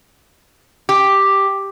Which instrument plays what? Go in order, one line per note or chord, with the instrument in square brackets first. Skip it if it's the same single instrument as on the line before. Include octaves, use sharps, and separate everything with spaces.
[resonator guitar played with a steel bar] G4